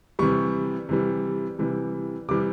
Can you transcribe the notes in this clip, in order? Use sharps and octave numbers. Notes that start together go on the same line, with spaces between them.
C3 E3 G3 C#6
C3 E3 G3
C3 E3 G3
C3 E3 G3 D6